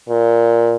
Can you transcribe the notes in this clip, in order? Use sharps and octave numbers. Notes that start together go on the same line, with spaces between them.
A#2